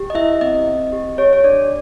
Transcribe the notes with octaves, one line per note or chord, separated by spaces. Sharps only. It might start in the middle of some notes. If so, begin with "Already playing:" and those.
Already playing: G4
D#5
E4 E5
C4 D#5
C4
G4
G4 C#5
C#5
D4 D5